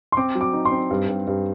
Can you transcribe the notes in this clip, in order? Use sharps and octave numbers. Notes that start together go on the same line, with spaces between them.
C6
C4 D6
F#3
D6
D#4
C6
C4
G2
G2
G2